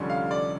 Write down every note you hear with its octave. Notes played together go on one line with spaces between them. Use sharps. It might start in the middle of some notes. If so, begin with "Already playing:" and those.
Already playing: F1 F2 D3 G3 C#4
F5
D5